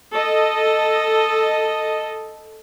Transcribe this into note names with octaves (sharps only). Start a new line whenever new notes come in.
A4 D#5